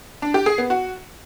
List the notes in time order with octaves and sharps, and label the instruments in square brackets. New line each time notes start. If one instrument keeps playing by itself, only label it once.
[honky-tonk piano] D4
G4
G#4
B3
F#4